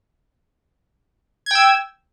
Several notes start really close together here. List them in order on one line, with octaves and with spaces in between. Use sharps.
G#6 G5 E6